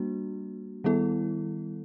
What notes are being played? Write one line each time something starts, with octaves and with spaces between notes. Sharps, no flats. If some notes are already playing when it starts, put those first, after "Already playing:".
Already playing: G3 A#3 D4 F#4
D#3 G3 B3 E4 A4